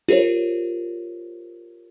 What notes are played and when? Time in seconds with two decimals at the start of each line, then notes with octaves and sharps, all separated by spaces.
0.09 F4 G4 A#4 C5 C#5